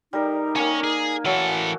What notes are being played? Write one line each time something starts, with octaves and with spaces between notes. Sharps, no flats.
G3 D#4 A#4
A#3 C#4 C#5 G#5
G#4
E3 F#3 A4